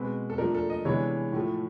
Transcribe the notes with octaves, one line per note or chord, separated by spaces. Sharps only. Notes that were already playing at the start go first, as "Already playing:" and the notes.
Already playing: B2 G#3 C4 B4
A4
A#2 F3 A3 D4 A#4
A4
D#5
C3 E3 G#3 B3 D4 C#5
A2 F3 A3